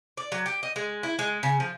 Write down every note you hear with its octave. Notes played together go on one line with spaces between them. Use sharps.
D5
F#3
G4
D#5
G#3
E4
G#3
C#3
F3